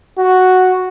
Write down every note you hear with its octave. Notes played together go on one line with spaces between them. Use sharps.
F#4